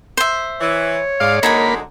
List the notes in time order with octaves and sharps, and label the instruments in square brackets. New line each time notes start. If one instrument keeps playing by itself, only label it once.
[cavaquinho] C5 E5
[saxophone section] E3 [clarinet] C#5
[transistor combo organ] G#2 D5 [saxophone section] F5
[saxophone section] F#2 D3 G#3 [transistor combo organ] A#3 B5 [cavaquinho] D#4 G#5 A#5